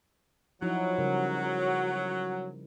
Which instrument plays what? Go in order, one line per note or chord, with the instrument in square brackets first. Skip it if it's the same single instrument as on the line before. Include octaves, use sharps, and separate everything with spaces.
[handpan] F3 D#4 E4 [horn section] F#3
[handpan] C#3 G3 A#4